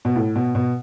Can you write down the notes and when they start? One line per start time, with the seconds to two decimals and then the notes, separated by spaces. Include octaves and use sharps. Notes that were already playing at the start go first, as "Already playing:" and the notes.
0.05 B2
0.16 A2
0.36 B2
0.55 B2